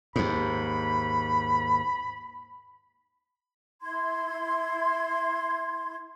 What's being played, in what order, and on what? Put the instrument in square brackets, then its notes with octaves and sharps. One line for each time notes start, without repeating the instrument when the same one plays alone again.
[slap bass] D#2 G#2 [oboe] B5
[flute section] E4 C6 G#6